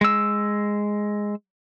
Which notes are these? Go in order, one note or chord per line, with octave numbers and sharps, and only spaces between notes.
G#3 E6